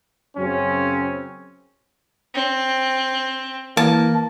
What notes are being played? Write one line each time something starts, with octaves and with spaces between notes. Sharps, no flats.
F#2 C#3 F#3 C4 C#4
C4
E3 A#3 A5